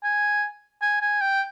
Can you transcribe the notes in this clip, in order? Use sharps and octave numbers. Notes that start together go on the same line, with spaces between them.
G#5
G#5
G#5
G5